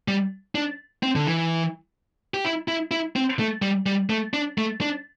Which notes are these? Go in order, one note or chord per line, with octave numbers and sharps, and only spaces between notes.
G3
D4
C4
D3
E3
G4
E4
E4
E4
C4
A3
G3
G3
A3
D4
A3
D4